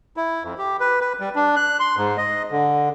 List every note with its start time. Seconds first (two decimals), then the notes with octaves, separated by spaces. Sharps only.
0.17 E4
0.44 F2
0.58 G4
0.80 B4
1.01 B4
1.20 G3
1.35 D4
1.56 F#6
1.80 C6
1.97 G#2
2.17 D#5
2.51 D3